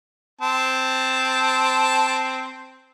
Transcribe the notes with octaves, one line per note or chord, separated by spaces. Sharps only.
C4 A5